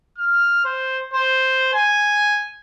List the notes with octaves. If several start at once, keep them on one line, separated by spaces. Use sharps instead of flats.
F6
C5
C5
G#5